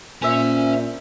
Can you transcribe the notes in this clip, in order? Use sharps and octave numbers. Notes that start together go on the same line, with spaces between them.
A#2 C#4 C5 E5 G#5